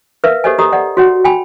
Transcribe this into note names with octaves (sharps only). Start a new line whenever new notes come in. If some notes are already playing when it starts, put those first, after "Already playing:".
A#4 B4 E5 F5
G4 A4 C5 C#5 D#5 G#5
G4 A4 C#5 D#5 A#5 D#6
D5 D#5 F#5
F#4 C#5 F#5
G5 G#5 B5